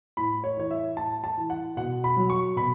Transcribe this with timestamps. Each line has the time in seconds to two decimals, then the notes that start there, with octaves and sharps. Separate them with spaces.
0.17 A2 B5
0.44 C#5
0.57 E3 C#5
0.71 E5
0.97 A2 A5
1.24 A5
1.37 E3
1.50 F#5
1.77 B2 F#5
2.04 B5
2.17 F#3
2.30 C#6
2.56 B2 B5